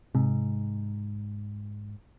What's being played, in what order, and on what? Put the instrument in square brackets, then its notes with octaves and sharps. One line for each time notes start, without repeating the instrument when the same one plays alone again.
[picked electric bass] G#2 [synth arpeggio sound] C3